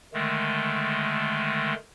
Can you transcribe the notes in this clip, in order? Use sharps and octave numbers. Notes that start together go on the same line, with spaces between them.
D3 D#3 G#3 A3